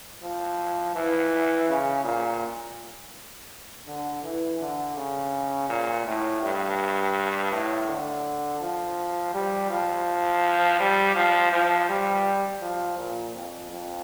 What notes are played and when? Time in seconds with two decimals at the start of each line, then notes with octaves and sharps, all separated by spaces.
0.22 F3
0.96 E3
1.68 C#3
2.04 A#2
3.87 D3
4.23 E3
4.60 D3
4.96 C#3
5.69 A#2
6.06 A2
6.42 G2
7.51 A2
7.88 D3
8.61 F3
9.34 G3
9.70 F3
10.80 G3
11.16 F3
11.52 F3
11.89 G3
12.62 F3
12.98 A#2
13.35 F2
13.71 F2